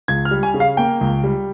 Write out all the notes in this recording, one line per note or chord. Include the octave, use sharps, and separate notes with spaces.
C#2 G#6
F6
G3
G#5
C#3
F5
A#3 G5
C#2
G3